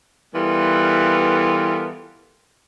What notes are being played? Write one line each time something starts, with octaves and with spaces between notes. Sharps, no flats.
E3 G3 B3 F4 A4 A#4